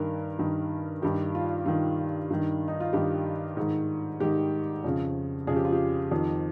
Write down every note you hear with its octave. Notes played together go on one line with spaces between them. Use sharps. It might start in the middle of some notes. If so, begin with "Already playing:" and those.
Already playing: G2 D#3 A#4
G2 D#3
G2 D#3 G4
F4
G2 D#3 F4
G2 D#3
D#4
F4
G2 D#3 G4
G#2 D#3
G#2 D#3 G4
F2 C#3
F2 C#3 G#4
G4
F4
G4
F2 D#3